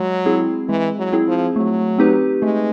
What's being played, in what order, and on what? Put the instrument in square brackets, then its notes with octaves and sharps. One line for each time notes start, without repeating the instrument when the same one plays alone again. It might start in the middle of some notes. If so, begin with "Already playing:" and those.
Already playing: [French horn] F#3 [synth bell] G#3
[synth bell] C4 E4 G#4
[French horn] E3 [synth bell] G#3
[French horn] F#3
[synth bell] C4 E4 G#4
[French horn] F3
[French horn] F#3 [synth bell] A3
[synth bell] C4 D#4 G4 B4
[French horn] G#3 [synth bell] A3